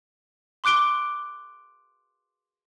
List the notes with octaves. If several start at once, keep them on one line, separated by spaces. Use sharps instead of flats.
C6 D6 F#6 D7 G7